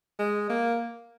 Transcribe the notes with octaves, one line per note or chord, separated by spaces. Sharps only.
G#3
A#3